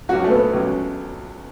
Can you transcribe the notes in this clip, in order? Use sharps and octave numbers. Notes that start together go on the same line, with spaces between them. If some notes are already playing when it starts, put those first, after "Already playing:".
C#2 C#3 F#3 F#4
A3
B3
C#2 C#3 F#3